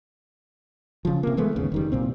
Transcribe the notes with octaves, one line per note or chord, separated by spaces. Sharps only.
C#3 F3
C3 A#3
E3 G#3 A3 B3
D#2 G#2 C#3
F1 D#3 G3
C2 A#2 C4